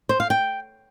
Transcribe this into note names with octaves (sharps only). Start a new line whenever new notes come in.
C5
F5
G5